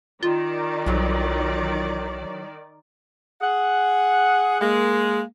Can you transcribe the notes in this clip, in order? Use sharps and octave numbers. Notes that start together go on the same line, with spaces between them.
D#3 F4 D5
B1 E3 F#3
G#4 F#5
G#3 A#3